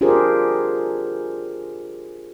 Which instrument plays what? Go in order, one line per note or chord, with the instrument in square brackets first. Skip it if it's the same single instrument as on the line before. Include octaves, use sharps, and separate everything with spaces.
[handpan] D4 F4 G4 G#4 A#4 C5